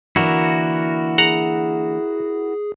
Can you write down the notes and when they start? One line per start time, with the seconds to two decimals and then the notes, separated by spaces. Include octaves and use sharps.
0.16 D3 E3 A#3 E4 F#4 A#4
1.18 G#4 F#5 A#5